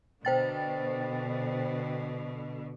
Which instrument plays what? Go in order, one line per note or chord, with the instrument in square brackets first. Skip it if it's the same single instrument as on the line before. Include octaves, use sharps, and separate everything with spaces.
[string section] B2 D3 [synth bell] C5 G5 A6